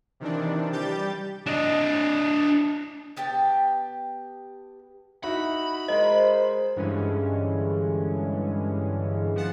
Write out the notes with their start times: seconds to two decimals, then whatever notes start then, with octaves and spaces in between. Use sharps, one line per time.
0.20 C3 D#3 E3 D4
0.72 G3 G4 G6 A6
1.47 D4 D#5
3.17 B3 G4 G5 A5
5.24 D#4 E4 F#4 B5
5.88 G#3 A#4 C5 D#5
6.76 G2 D3 E3 G#3 C#4
9.36 F3 B3 F#5 A5 C7